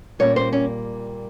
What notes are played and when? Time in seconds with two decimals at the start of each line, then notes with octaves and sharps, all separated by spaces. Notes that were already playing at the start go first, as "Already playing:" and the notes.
0.19 A#2 G3 A#3 C#4 C#5
0.36 C5
0.53 C#4